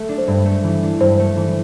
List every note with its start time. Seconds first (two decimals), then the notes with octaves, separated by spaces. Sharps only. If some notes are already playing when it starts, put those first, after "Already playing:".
Already playing: A3
0.09 D4
0.18 C5
0.27 G2
0.46 A3
0.64 E3
0.83 D4
1.00 G2 C5
1.19 A3
1.37 E3